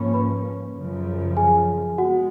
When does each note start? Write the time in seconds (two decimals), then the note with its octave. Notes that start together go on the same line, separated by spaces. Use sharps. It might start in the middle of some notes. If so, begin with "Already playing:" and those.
Already playing: G#2 F3 A#3 C#4 C#5 B5 C#6
0.14 B4 B5
0.75 F#2 C#3 F3
1.37 G#4 G#5
1.98 G#3 B3 F#4 F#5